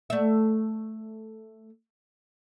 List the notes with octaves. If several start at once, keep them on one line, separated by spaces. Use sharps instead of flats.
A3 E5